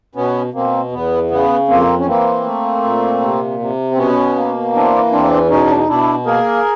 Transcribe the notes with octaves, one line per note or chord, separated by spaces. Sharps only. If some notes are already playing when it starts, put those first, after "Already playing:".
B2 B3 C#4
B2 A#3 C4
E2 B3
C#3 B3
F2 A#3 C4
C#4
E3 A#3 C4
A3
A#2
C3
C3
C4
B2 B3 C#4
A#3
E3 C4 D4
E2 C4 D4
B2 C#4 D#4
D4
D#4
B2 D4 E4
A#3 G#4 A#4